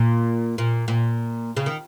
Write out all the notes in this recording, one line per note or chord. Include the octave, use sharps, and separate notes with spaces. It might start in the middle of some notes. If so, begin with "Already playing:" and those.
Already playing: A#2
A#2
A#2
C#3
D#3